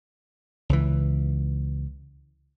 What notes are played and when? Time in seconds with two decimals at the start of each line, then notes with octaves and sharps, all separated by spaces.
0.69 C#2 E3